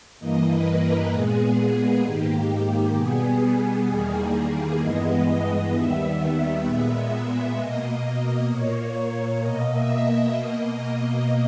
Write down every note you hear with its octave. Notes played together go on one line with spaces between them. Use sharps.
G2 E3 A#3 D#5
B4
A#4
A#2 G#3 B3 G#4
G#2 D#3 A#3 G4
B2 G3 B3 G#4
E2 D#3 G3 A#3
G2 E3 G#3 B3 D#5
D#2 D#3 G3 B3 E5
A#2 G#3 B3 E5
B2 A#3 D#5
A#2 A#3 C#5
B2 A#3 D#5
E5
D#5
B2 A#3 D#5
D#5